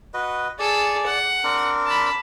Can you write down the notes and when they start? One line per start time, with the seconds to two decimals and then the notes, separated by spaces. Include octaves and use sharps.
0.14 F#4 B4 D#5
0.59 G#4 A4 D5
1.06 F#5
1.44 C4 D4 A#4
1.86 A5 B5